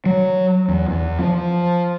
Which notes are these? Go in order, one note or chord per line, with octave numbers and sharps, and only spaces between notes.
F#3
E2
E2
F3